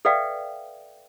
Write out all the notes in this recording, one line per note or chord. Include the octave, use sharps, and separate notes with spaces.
A4 B4 D5 E5 F5 G5